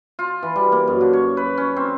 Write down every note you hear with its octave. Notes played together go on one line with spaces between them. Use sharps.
F4
E3
G3
A#3
F#2
D3
C#5
B4
C#4
C4